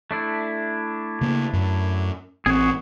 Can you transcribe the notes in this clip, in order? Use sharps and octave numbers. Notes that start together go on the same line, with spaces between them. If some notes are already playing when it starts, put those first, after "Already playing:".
A3 D4 E4
C#3 A#3
F#2
A1 C4 F#4 G#4